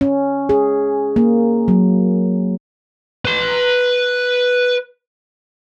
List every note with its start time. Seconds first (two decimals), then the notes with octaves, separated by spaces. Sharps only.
0.01 C#4
0.49 G#4
1.16 A#3
1.68 F#3
3.25 B4 C6